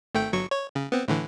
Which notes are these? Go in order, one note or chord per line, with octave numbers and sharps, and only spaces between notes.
G#1 A3 G5
G1 F#3 C#6
C#5
C#3
B3 C4
A2 D3 E3